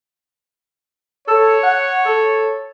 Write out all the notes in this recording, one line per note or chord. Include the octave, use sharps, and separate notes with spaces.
A4 C#5
F#5
A4